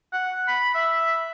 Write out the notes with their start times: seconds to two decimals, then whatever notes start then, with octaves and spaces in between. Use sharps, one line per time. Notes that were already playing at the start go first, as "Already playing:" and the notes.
0.13 F#5
0.48 B5
0.75 E5